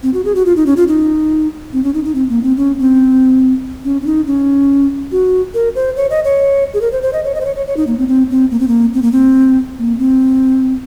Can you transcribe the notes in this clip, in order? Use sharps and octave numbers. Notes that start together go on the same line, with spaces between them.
C4
F#4
G#4
F#4
F4
D#4
C#4
F4
D#4
C4
C#4
D#4
D#4
C4
A#3
C4
C#4
C4
C#4
C#4
D#4
C#4
F#4
A#4
C5
C#5
D#5
C#5
G#4
A#4
C5
C5
D#5
C#5
D#5
C5
C#5
C#5
C#5
D#4
A#3
C4
C4
C4
A#3
C4
A#3
C4
A#3
C4
A#3
C4